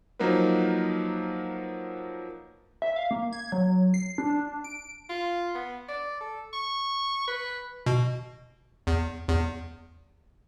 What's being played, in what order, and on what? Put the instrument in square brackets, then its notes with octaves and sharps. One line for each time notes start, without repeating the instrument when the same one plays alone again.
[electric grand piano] F3 F#3 A#3 D#4 A#4 B4
[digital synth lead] E5
F5
A#3
G#6
F#3
C7
D4
D4
D7
[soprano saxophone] F4
B3
D5
A4
C#6
B4
[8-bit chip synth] B2
E2
E2